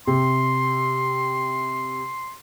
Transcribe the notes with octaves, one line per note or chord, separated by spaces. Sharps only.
C3 C6